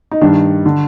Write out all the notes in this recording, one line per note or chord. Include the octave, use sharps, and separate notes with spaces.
D#4
G2 D#3 D4
D3